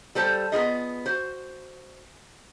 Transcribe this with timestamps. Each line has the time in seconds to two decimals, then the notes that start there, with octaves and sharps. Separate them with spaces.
0.15 G3 A4 C5 A5
0.52 B3 F4 G#4 D#5
1.06 F#4 C5